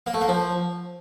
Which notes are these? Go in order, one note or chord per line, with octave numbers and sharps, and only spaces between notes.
A#3
A3
A#3
F3